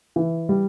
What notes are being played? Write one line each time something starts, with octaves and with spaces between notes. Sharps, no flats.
E3
G3